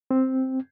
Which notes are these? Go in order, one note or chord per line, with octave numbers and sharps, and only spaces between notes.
C4